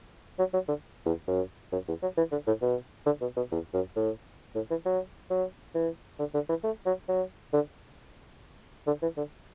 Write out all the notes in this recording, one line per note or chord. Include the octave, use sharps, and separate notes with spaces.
F#3
F#3
D3
E2
F#2
F#2
E2
F#3
E3
D3
A2
B2
D3
B2
B2
E2
F#2
A2
A2
E3
F#3
F#3
E3
D3
D3
E3
A3
F#3
F#3
D3
D3
E3
D3